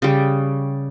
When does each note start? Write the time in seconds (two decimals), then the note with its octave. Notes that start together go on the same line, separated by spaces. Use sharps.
0.02 C#3 G3